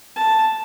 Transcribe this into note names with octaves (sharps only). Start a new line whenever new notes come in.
A5